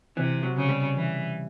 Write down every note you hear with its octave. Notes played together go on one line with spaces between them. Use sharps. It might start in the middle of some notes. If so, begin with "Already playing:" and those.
C3 E3
F#3
C#3
G3
E3